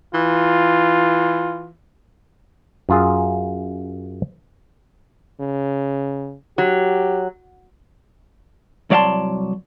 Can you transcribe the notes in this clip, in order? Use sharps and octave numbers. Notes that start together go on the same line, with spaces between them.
E3 F4
F#2 F4 G#4
C#3
F#3 G4
C2 F#3 D5 F5 A5 C6